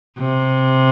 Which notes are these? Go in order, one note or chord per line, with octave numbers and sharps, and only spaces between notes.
C3